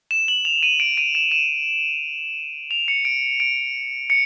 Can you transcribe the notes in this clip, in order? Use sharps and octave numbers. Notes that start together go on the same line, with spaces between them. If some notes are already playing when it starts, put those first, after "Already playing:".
E7
F#7
F7
D#7
D7
D#7
E7
E7
F7
C#7
D7
D7
C#7